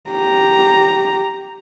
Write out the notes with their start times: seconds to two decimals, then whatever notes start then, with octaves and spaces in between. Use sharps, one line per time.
0.10 G4 A#5